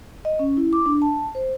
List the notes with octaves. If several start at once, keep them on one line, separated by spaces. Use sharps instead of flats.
D#5
C#4
E4
D6
D4
A5
C5